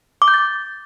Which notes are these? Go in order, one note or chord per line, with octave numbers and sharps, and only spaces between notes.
D6
G6
A6